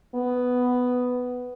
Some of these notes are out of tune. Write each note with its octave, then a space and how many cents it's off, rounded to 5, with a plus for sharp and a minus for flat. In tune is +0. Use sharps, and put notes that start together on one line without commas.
B3 +5